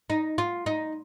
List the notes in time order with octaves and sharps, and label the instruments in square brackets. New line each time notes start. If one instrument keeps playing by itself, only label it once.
[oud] D#4
F4
D#4